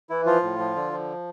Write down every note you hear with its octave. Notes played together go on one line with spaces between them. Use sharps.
E3 E4
F3 F4
A2
F3
D3
F3